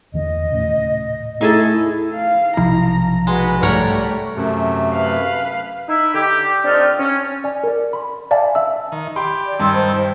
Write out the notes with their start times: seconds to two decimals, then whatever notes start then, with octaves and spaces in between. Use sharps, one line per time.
0.14 E2 D3 E3 D#5
0.51 D#1 A2 C#3
1.41 A2 D#4 G#4 A4
1.70 E4
2.13 F5
2.57 B1 C3 F3 E4 A#5
3.27 G#3 F#4 B4
3.62 G#2 G3 A3 A#4 C#5 F#5
4.36 F#2 C3 A3
4.92 B4 F5
5.88 D#4 E4 E5
6.14 D3 G4
6.64 C4 D4 D#4 F4 A4 A#4
6.99 C#4
7.44 D5 G#5
7.64 A#4 D5
7.93 B5 C6
8.31 D5 E5 F5 G#5 A5
8.55 E5 E6
8.92 D#3
9.16 G4 G5 B5 C6
9.46 D5
9.59 G2 D#3 G5 A5 C6 E6
9.74 C5